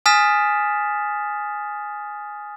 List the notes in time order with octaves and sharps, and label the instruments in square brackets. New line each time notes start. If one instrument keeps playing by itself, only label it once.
[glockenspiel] G#5 D#6 F6 A6 B6 E7